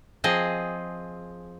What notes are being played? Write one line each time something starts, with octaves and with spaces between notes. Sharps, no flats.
F3 C4 G#4 D#5